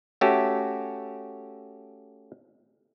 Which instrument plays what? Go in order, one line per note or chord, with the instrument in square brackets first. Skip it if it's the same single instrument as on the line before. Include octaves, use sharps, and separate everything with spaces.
[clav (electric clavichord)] A3 C#4 F#4 G4